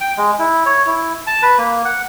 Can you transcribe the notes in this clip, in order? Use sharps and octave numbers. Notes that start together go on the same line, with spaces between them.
G5
G#3
E4
C#5
E4
A5
B4
A#3
F#5